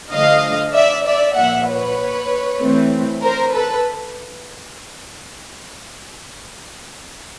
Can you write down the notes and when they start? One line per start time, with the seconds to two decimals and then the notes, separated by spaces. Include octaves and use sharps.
0.11 D3 F3 A3 D#5 F5
0.73 D5 E5
1.05 D5 E5
1.36 A#2 F3 A#3 E5 F#5
1.67 B4 C#5
2.61 E3 A3 C4
3.23 A#4 C5
3.54 A4 B4